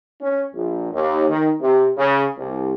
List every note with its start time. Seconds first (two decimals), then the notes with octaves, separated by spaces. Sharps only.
0.22 C#4
0.55 A#1
0.93 D#2
1.29 D#3
1.60 C3
1.97 C#3
2.37 C2